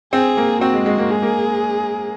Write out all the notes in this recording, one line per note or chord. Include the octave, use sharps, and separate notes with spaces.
C4 G#4
A#3
C4 F#4
G#3
G#3
A#3
G#3 G#4
A#3